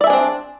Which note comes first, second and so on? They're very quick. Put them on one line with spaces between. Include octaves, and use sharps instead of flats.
D5 E5 G#4 D4 C4